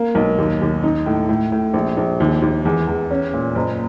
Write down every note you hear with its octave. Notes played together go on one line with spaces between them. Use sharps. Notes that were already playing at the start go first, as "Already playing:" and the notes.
Already playing: A#3
B1
D#2
D#2
D#4
A2
A2
A2
A#1
A#1
D#2
D#2
E2
E2
C#4
A#2
F#1